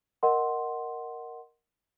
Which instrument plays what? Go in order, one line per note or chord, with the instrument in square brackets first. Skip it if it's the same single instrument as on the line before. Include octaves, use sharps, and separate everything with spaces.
[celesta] A#4 D#5 F#5 C6